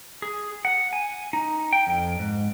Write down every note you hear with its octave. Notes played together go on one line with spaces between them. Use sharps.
G#4
F#5
G#5
D#4
G5
F2
G#2